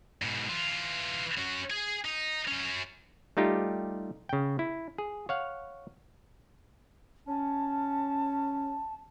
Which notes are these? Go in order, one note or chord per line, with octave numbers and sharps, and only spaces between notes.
G#2 B2
E3 F4
C#4 F#4
G#4 G#5
D#4
F#2 C#4
G3 A3 D#4 F4 G4
C#3 G5
E4
G#4
C#5 F5 F#5
C#4 A5